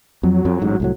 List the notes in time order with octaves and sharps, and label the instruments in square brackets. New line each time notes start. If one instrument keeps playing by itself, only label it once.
[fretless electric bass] F2 [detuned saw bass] F#3
[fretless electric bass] F2
A1 G#2
C2 A2 F#3